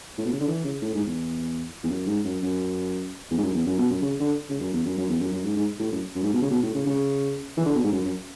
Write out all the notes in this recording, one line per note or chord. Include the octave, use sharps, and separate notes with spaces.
A2
B2
C#3
D3
E3
C#3
A2
G#2
E2
E2
F#2
G#2
F#2
F#2
E2
G#2
F#2
E2
F#2
B2
F#2
C#3
D3
C#3
F#2
E2
F#2
F#2
E2
F#2
F#2
G#2
G#2
A2
F#2
F#2
G#2
B2
C#3
B2
A2
C#3
C#3
E3
D3
B2
G#2
F#2
F#2